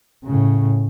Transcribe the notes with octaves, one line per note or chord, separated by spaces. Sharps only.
A2 C#3